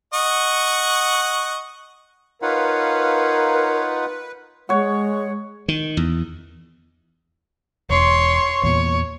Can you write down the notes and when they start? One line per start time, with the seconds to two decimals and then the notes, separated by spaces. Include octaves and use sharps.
0.14 D#5 F#5 C#6
2.42 D#4 F4 A#4 B4 C#5 F5 F#5
4.69 G#3 C#5 F#5
5.68 D#3
5.97 E2
7.90 E1 C#5 C6
8.64 E2 A#2 C#5